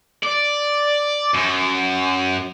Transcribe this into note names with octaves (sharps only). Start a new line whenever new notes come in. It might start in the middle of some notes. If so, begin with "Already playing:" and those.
D5
F#2